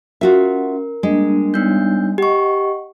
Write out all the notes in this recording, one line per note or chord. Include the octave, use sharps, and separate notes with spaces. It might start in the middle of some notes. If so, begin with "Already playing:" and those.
C#4 F4 F#4 A#4 E5
G3 G#3 A#3 D4
G3 B3 D4 D#4 C#5 G6
G4 D#5 F#5 C#6